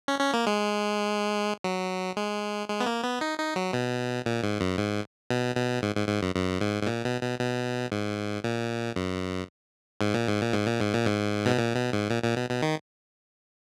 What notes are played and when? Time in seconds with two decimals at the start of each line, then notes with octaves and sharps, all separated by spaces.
0.08 C#4
0.20 C#4
0.34 A#3
0.47 G#3
1.64 F#3
2.17 G#3
2.69 G#3
2.80 B3
2.86 A#3
3.04 B3
3.21 D#4
3.39 D#4
3.56 F#3
3.73 B2
4.26 A#2
4.43 G#2
4.61 F#2
4.78 G#2
5.30 B2
5.56 B2
5.82 G#2
5.95 G#2
6.08 G#2
6.22 F#2
6.35 F#2
6.61 G#2
6.83 G#2
6.87 A#2
7.05 B2
7.22 B2
7.40 B2
7.92 G#2
8.44 A#2
8.96 F#2
10.01 G#2
10.14 A#2
10.27 G#2
10.41 A#2
10.53 G#2
10.67 A#2
10.80 G#2
10.93 A#2
11.06 G#2
11.46 B2
11.58 A#2
11.75 B2
11.93 G#2
12.10 A#2
12.23 A#2
12.36 B2
12.50 B2
12.62 D#3